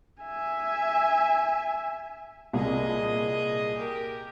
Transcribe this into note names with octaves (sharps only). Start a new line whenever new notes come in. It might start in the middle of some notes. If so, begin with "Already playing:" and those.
E5 G#5
C2 A#2 G#4 D#5
G4 A#4